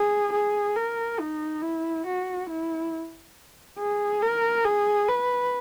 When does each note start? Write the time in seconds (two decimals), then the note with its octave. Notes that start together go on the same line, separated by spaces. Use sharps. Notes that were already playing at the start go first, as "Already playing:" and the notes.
Already playing: G#4
0.32 G#4
0.76 A#4
1.19 D#4
1.62 E4
2.06 F#4
2.49 E4
3.78 G#4
4.22 A#4
4.65 G#4
5.08 B4